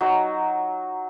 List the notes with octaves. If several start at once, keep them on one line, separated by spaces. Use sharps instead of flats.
F#3 D#4 D#6